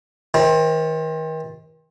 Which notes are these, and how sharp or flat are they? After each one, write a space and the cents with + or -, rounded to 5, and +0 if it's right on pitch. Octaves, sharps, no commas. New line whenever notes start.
D#3 +40 C4 +25